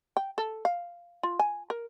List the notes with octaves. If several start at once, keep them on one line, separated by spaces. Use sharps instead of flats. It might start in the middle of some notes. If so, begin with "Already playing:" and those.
G5
A4
F5
F4
G#5
A#4